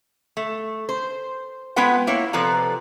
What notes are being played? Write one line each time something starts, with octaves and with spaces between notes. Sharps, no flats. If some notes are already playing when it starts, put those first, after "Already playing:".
A3
C5
G#3 B3 F4 B4 F#5 G5
A#3 E4 C#5 F5
C3 F3 A4 B4 D5 A#5